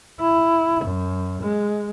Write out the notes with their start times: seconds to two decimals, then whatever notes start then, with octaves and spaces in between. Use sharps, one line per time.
0.20 E4
0.84 F#2
1.42 G#3